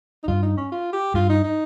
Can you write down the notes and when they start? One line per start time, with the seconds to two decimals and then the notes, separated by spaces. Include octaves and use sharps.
0.23 D#4
0.28 G2 F4
0.43 D#4
0.57 C#4
0.72 F4
0.93 G4
1.14 G2 F4
1.29 D#4
1.43 D#4